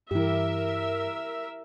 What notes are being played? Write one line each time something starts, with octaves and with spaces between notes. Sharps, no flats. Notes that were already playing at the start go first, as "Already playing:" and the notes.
G2 E3 E4 G4 A#4 E5